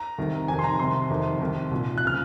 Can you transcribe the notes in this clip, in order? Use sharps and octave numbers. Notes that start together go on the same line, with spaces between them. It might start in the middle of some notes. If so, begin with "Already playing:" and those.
Already playing: A#5
C2 C3 D#3
F2 C3 D#3 G#5
C6
A#5
C2 C3 D#3 C6
F2 C3 D#3
C2 C3 D#3
C2 A#2 F3
F#6
C#3 F3 F6